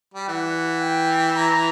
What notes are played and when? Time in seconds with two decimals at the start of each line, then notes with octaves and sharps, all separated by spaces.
0.14 G3
0.28 E3 F#5
0.81 G5
1.35 A#5